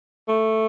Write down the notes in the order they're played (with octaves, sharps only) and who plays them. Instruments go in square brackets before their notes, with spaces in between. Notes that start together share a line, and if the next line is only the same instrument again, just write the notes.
[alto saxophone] A3